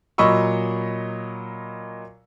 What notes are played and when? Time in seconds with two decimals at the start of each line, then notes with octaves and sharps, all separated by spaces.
0.18 A#2 F#3 D#5 B5 C#6 E6